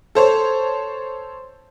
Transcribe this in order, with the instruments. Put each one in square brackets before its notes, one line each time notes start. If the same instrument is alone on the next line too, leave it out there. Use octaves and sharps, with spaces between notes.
[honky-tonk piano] A4 C5 C#5